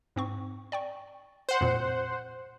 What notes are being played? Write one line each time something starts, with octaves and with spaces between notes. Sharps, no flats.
G#2 C4 C#6
D5 G5 C#6
C5 F#5
F2 A#2